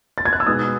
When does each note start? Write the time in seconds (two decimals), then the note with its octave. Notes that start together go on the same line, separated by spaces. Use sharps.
0.18 A6
0.25 G#6
0.33 F#6
0.40 E6
0.47 B2 G#3 B3 D#4 D#6